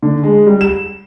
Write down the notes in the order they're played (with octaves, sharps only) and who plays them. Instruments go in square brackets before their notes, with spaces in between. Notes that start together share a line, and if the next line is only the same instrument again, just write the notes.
[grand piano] D3
G#3
G3
E7